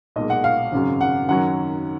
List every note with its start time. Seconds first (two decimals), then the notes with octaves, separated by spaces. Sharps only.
0.16 B1 A#2 G#3 D#5
0.30 F#5
0.44 F5
0.72 G#1 F#2 C#3 F#3
1.01 F#5
1.29 F#2 D#3 F#3 C#4 F#5